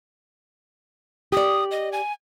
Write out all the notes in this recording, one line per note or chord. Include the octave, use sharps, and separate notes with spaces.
G4 D5 D#6
D#5
G#5